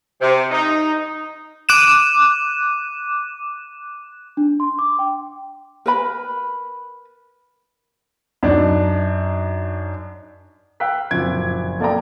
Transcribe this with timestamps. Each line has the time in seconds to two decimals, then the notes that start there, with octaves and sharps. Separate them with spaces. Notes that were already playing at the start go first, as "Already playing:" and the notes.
0.21 C3
0.51 D#4
1.69 D6 F#6 D#7 E7
4.37 D4
4.60 C6
4.79 D6
4.99 G5
5.86 A#4 B4 B5
8.43 F#2 D4 D#4
10.80 F5 G5 E6 F#6 B6
11.11 F#1 F2 A#2 G#6 D7
11.80 A#3 A4 D5 F5 G5 A#5